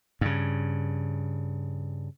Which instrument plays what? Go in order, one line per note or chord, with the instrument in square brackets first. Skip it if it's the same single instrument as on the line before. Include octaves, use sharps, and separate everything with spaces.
[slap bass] G2 C#3